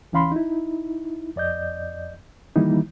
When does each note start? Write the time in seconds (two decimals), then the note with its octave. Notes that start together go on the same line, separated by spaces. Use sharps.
0.12 C#2 E3 C#4 F5 B5 C6
0.32 D#4 E4
1.36 F2 D5 D#5 G6
2.56 D#3 E3 G3 A#3 D#4 E4